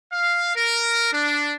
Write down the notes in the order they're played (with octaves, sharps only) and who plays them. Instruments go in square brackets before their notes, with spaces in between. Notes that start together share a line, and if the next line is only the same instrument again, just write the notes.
[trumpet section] F5
A#4
D4